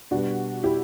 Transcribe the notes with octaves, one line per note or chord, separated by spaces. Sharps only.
B2 G3 B3 D4 F#4
E4 G4